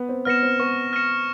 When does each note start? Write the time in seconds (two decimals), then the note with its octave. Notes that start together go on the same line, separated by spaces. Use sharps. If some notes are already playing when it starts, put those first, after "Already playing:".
Already playing: B3
0.09 C4
0.25 B3 F6 A#6 C#7 E7
0.43 C4
0.60 B3 C#6
0.93 F6 A#6 C#7 E7